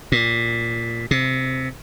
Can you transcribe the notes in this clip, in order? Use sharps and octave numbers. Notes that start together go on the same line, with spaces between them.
A#2
C3